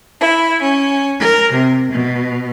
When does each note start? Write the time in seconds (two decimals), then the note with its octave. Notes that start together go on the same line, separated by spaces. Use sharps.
0.20 E4
0.61 C#4
1.20 A#4
1.52 C3
1.91 B2